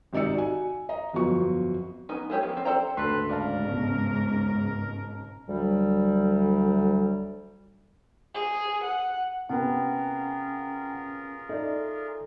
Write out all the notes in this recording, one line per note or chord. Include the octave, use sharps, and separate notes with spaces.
G#1 C3 D#4 D5 E6 C#7
F#4 G#5
D#5 A#5
G1 F2 F#3 B3 F4 C#6
B3 C#4 D#4
G#3 E4 G4 C#5
F3 B3
C4 A4
A4 C5 D5 G5 A#5
D2 G#2 C#3 A4 B4 C6
A#4 D5 F5 A5
C#2 B2
D2 F#3 G3
G#4
F#5
C3 B3 C#4 F4 G#4 A#4 F#5 G5
D#4 A4 D5 E5